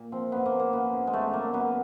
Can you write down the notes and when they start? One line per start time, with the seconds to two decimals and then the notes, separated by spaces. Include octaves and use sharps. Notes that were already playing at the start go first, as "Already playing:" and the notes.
Already playing: A#2
0.12 F3 C4
0.32 F#2 B3
0.46 A#3
0.52 F3
0.60 A#3
0.73 F#2 B3
0.93 C#3
1.07 G#3
1.13 F#2 A3
1.33 F#3 A#3
1.53 F#2 B3